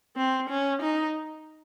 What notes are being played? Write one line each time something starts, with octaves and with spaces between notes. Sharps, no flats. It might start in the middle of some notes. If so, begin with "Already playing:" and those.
C4
C#4
D#4